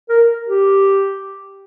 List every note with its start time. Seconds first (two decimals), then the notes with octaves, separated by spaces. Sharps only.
0.09 A#4
0.48 G4